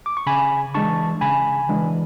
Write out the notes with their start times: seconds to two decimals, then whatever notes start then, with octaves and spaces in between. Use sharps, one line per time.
0.06 D6
0.17 C#6
0.26 C#3 G#5 B5
0.75 E3 G#3 D4 A5 C#6
1.21 C#3 G#5 B5
1.69 E3 G#3 D4